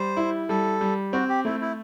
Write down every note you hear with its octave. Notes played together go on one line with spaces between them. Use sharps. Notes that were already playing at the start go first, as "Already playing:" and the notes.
Already playing: G3 C5
E4
G3 A4
G3
C4 F#4
G4
A3 E4
E4